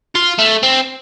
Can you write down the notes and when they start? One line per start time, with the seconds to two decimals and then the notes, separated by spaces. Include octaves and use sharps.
0.15 F4
0.39 A3
0.63 C4